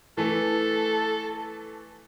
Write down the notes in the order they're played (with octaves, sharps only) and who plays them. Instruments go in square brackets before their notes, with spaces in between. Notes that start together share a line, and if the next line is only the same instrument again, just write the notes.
[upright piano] E3 A3 [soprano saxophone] A4